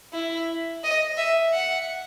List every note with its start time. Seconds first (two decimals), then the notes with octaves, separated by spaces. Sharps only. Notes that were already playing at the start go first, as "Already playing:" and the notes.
0.13 E4
0.83 D#5
1.17 E5
1.52 F#5